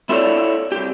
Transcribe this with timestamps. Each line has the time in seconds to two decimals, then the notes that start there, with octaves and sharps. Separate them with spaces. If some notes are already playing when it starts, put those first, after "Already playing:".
0.09 E4 F4 A4 A#4 C#5 D5
0.72 C2 G4